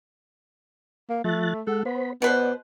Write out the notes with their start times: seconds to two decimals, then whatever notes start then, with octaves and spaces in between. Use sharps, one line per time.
1.09 A#3
1.24 F3 A3 F#6 A6
1.67 G#3 A4 F#5
1.85 B3 C5 B5
2.22 B2 B3 B4 C5 D5